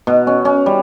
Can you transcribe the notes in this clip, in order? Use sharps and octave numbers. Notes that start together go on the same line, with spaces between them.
B2
C#4
C#4
G3